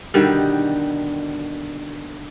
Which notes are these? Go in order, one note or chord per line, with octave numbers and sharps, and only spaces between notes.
B2 D3 D#3 G3